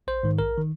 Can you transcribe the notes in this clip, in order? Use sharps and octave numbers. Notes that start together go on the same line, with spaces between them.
A#1 C5
G#2 D#3
A#1 A#4
D#3